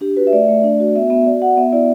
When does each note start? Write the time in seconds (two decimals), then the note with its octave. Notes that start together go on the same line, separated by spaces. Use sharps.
0.01 D4 G4
0.16 F#4 B4
0.27 E5
0.33 A3 D5
0.48 A3
0.64 D4
0.80 F#4
0.96 B3 E5
1.10 B3 E5
1.26 F#4 D5
1.42 F#4 F#5
1.57 B3 E5
1.73 E4 D5